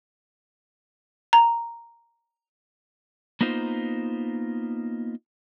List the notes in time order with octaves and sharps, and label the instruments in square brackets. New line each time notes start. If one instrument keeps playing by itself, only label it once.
[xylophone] A#5
[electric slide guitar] A#3 B3 D#4 F4 C5